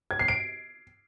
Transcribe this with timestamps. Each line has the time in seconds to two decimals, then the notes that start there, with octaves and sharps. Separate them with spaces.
0.11 G#6
0.19 C7
0.28 D7